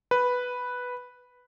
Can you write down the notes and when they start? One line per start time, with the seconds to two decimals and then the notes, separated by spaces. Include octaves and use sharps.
0.11 B4